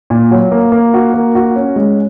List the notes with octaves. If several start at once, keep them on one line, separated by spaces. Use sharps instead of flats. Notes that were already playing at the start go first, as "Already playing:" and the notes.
A#2
F#3
A#3
A#3
F#4
A#3
F#4
C#4
G#3